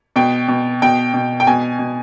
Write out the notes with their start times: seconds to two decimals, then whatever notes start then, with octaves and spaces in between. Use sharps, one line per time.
0.16 B2 G5
0.48 B2
0.82 B2 G5
1.14 B2
1.40 G5
1.47 B2 G#5
1.79 B2